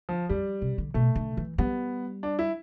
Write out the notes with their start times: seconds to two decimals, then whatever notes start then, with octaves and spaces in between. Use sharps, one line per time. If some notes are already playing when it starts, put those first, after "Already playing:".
0.09 F3
0.29 F2 G3
0.62 C3
0.78 D3
0.94 B2 A3
1.16 D3
1.37 E3
1.58 G3 B3
2.23 D4
2.39 E4